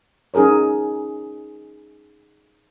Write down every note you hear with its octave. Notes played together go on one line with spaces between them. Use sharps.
C#4 D#4 G#4 A#4 C#5